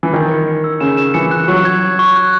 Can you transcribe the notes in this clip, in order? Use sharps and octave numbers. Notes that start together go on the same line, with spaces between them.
E3
D#3 G#6
C#7
C#7
E6
C#3 E7
E7
E3 C#7
F#6
F#3 C#6
G#6
C#6
C#6
F#6